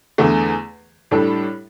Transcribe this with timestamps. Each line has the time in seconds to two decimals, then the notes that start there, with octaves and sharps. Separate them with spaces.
0.18 E2 D3 A3
1.11 A2 G3 D4 A4